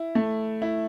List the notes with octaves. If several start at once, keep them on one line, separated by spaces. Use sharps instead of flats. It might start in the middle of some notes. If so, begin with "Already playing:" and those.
Already playing: E4
A3
E4